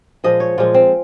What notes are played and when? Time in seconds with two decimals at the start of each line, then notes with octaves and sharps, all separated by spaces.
0.24 A#2 F3 G#3 D#5
0.40 C#5
0.58 A#2 F3 G#3 F4
0.74 C4